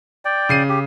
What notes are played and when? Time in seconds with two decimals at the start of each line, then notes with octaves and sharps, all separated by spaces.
0.25 D5 G5
0.49 C#3 C7 D#7
0.69 G4